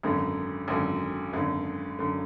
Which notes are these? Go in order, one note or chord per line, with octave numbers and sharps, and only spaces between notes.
G#1 F#2 D3
G#1 F#2 D3
G#1 F#2 D3
F#2 D3